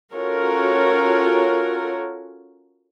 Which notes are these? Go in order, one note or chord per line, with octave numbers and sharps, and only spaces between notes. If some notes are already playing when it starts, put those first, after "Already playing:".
C#4 F4 F#4 A4 A#4 C#5